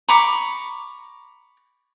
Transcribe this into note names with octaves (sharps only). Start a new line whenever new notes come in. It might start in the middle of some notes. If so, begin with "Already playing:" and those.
A#5 B5 C#6 D6